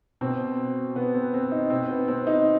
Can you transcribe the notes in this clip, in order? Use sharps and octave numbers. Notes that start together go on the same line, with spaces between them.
B2 C4
B2 B3
C4
C4
D#4
B2 C4
B3
C4
D#4